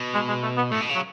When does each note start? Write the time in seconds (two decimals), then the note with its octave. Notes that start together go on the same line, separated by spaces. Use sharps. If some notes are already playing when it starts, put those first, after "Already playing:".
Already playing: B2
0.14 G#3
0.28 G#3
0.43 A3
0.57 B3
0.71 A2 A3
0.81 B2
0.89 C#3
0.95 F#3